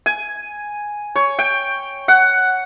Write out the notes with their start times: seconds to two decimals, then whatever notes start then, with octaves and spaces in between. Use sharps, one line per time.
0.06 G#5
1.16 C#5
1.39 G5
2.08 F#5